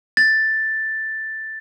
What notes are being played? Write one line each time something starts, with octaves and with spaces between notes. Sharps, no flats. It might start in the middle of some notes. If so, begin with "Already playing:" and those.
A6